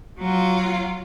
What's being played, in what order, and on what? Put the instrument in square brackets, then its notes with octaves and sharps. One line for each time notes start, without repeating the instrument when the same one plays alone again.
[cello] F#3 F4